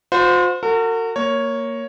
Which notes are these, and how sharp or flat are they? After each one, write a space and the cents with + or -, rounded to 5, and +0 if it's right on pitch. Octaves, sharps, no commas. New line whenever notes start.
F4 +45 C5 -20
F#4 -10 A#4 -45
A#3 -5 C#5 +0